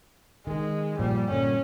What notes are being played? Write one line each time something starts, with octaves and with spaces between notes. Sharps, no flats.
D#3 G#3
G2 A#2 F3 G3
G2 A#2 D3 C#4